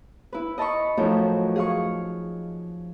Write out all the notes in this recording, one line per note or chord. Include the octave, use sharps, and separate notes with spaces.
E4 B4
D#5 A5 B5 C#6
F#2 A2 F3 D#4
G#4 F5 C#6